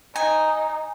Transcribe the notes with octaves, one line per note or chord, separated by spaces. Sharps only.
D#4 G#5